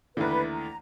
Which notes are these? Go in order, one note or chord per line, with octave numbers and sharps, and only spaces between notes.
D#2 D3 E3 A3 E4 B4
A#5